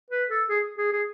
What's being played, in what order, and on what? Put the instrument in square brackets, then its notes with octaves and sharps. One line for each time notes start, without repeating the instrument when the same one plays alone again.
[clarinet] B4
A4
G#4
G#4
G#4